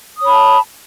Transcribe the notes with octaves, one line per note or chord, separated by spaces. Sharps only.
C#5 A5 B5 D#6